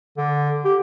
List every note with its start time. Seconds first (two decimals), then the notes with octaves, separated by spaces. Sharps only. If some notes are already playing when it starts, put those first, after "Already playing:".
0.17 D3
0.65 G4